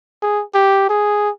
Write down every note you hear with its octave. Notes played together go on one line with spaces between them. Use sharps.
G#4
G4
G#4